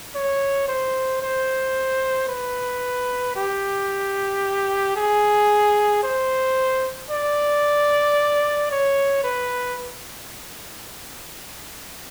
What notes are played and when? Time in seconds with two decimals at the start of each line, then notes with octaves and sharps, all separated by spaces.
0.15 C#5
0.68 C5
1.22 C5
2.28 B4
3.36 G4
4.96 G#4
6.03 C5
7.10 D5
8.71 C#5
9.24 B4